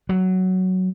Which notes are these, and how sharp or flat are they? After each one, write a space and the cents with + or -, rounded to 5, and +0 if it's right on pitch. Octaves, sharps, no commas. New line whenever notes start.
F#3 +5